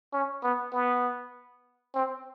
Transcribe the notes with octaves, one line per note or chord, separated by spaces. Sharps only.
C#4
B3
B3
C4